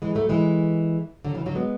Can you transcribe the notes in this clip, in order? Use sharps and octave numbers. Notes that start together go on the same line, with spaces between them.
E3 G#3
F#3 A3
E3 G#3
D3 F#3
C#3 E3
D3 F#3
G#3 B3